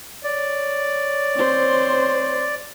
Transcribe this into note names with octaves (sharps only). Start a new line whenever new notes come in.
C#5 D5
C4 C5